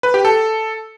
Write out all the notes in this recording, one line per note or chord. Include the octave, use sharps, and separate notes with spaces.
B4
G4
A4